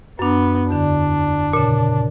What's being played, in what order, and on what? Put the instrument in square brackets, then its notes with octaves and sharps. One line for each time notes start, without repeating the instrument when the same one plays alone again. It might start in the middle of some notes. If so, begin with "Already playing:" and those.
[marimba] F#2 D4 [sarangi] B3
[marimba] E2 D3 [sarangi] D4
[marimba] A#2 C#3